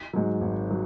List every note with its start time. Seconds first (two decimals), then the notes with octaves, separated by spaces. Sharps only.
0.13 G#2 F#3
0.41 G#1
0.71 F#3